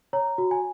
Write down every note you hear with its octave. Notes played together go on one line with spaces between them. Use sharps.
C#5 A#5
F#4
G#5